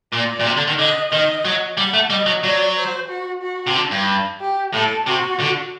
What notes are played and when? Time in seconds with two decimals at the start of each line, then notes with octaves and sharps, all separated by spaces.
0.13 A#2 D5
0.40 A#2
0.46 C3
0.57 D3
0.67 D#3
0.78 D3 D#5
1.11 D#3 D#5
1.45 F#3
1.77 G3 F#5
1.93 A3
2.10 G3 D#5
2.26 F#3
2.43 F#3 D5
2.77 C5
3.09 F#4
3.42 F#4
3.67 C3
3.75 D3
3.91 G2
4.41 G4
4.73 A2 A4
5.06 C3 F#4
5.40 D3